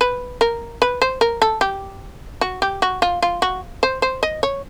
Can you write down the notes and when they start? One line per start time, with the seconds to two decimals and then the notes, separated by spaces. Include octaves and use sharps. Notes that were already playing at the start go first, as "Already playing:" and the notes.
0.01 B4
0.41 A#4
0.82 B4
1.02 C5
1.21 A#4
1.42 A4
1.61 G4
2.41 F#4
2.62 G4
2.82 F#4
3.02 F4
3.22 F4
3.42 F#4
3.83 C5
4.02 C5
4.23 D#5
4.43 C#5